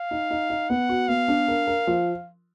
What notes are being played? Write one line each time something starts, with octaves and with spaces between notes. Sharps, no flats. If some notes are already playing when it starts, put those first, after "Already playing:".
Already playing: F5
D#4
D#4
D#4
B3 F#5
F#4
B3 F5
D4
A#4
A#4
F3